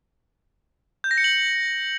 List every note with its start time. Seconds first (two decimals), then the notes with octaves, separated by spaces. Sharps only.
1.04 G6
1.11 A#6
1.18 C#7
1.24 F#7